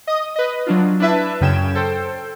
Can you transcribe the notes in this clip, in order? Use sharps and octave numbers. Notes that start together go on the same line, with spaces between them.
D#5 D#6
B4 D#5
F#3 D4 F4
D4 E4 B4 E5 A5
F#2 C#3 C#4 G5 G#6 E7
A4 C5 G5